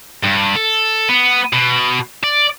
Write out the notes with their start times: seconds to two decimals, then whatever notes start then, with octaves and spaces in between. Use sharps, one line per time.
0.24 G2
0.56 A4
1.09 B3
1.53 B2
2.23 D5